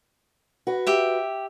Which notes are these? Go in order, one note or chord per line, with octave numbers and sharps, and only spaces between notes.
F#4 B4
G4 E5